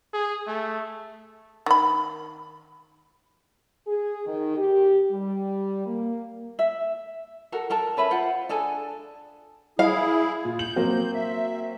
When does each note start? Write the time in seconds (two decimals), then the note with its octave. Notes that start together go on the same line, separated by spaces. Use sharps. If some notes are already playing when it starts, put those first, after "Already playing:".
0.13 G#4
0.47 A3
1.66 D#3 B5
3.87 G#4
4.26 D#3
4.57 G4
5.11 G3
5.86 A#3
6.59 E5
7.52 F#4 A4 A#4
7.70 A4 A#4 A5
7.97 C#4 B4 E5 B5
8.11 F4 C5 F#5
8.49 D4 G#4 A4 G#5
9.79 E4 G#4 F5
10.45 A#2
10.59 G6 F#7
10.76 F#3 A#3 C4
11.14 E5